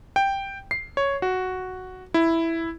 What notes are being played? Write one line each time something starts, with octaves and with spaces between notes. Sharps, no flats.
G5
C7
C#5
F#4
E4